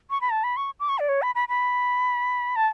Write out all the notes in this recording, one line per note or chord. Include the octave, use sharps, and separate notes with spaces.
C#6
B5
A5
B5
C#6
D6
C#6
D5
C#5
B5
B5
B5
A5